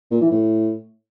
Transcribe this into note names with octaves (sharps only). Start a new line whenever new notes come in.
A#2
E3
A2